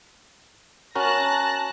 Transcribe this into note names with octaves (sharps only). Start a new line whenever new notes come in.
C#4 F#4 A#4 A5 F#6 A#6